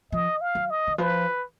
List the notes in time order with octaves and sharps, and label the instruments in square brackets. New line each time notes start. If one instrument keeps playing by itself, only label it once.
[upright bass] F3 [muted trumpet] D#5
[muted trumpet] F5
[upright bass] F#3
[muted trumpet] D#5
[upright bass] D#3
[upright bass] F3 [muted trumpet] B4